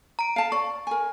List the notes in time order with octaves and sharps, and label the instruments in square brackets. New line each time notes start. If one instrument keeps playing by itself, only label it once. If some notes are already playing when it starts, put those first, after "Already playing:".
[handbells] A#5 D7
[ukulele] F5 A5
[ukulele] D5 [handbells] C#6
[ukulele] A#4 G#5